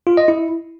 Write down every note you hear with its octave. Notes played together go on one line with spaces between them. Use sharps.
F4
D#5
E4